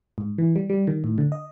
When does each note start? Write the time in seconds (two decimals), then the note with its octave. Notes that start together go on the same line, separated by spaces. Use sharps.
0.18 G#2
0.38 E3
0.56 G3
0.70 G3
0.87 D#3
1.04 A2
1.18 D3
1.32 D#5